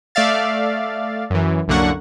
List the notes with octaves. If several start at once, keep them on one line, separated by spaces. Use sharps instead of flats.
A3 D5 E5 F5 A6
F#2 E3
C2 F#2 D3 A#3 F#5 C#6